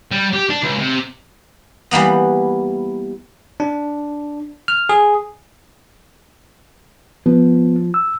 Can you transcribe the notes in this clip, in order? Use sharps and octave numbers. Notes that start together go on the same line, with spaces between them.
G3
G4
D4
C#2
C3
E3 G3 A#3 B3
D4
F6
G#4
F3 B3
E6